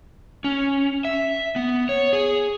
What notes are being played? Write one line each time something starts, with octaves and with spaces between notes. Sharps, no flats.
C#4
E5
B3
C#5
G#4